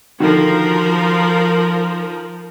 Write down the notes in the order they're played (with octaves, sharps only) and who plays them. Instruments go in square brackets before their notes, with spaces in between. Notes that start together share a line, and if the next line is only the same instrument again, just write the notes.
[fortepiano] D3 D#3 F#4 [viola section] F3 A#4